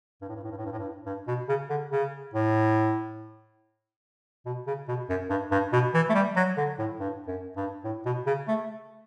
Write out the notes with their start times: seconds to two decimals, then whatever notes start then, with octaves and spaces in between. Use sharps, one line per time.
0.22 G2
0.29 A2
0.36 G2
0.44 A2
0.51 G2
0.58 A2
0.66 G2
0.72 A2
0.79 G2
1.06 G2
1.28 B2
1.49 C#3
1.70 D3
1.91 C#3
2.34 A2
4.46 B2
4.67 C#3
4.88 B2
5.10 F#2
5.30 G2
5.51 G2
5.73 B2
5.94 E3
6.10 A3
6.15 G3
6.36 F#3
6.57 D3
6.79 A2
7.00 G2
7.27 F#2
7.56 G2
7.85 A2
8.06 B2
8.27 C#3
8.48 A3